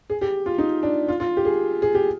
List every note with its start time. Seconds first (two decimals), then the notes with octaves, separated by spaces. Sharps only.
0.10 G#4
0.21 G4
0.46 F4
0.58 D#4
0.83 D4
1.08 F4
1.20 F4
1.37 G4
1.45 G#4
1.82 G#4
1.95 G4